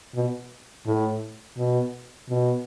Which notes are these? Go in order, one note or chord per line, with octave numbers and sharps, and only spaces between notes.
B2
A2
B2
B2